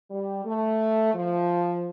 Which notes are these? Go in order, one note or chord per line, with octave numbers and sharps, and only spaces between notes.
G3
A3
F3